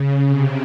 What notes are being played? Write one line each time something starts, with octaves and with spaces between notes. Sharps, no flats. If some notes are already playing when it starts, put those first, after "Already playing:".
Already playing: C#3
C3